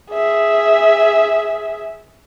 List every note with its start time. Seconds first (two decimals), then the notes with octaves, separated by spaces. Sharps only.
0.12 G#4 E5